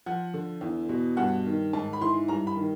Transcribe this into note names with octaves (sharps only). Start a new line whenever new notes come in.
F3 F#5
D3
E2
B2
G2 F#5
D#3
G#2 A5
B5
E3 C6
G2 A#5
B5
D#3